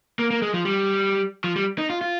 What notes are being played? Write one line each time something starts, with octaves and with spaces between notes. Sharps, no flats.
A#3
A#3
G#3
F3
G3
F3
G3
D#4
F4
F4